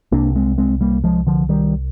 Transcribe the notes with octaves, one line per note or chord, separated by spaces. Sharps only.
C2 C3 A#3 D4
G#3 C4
G#3 C4
G3 A#3
F3 G#3
D3 F3
D#3 G3